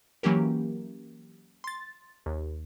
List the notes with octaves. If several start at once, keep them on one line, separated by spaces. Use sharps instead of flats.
E3 F#3 A#3 C#4 G4 A#4
C6 A6
D#2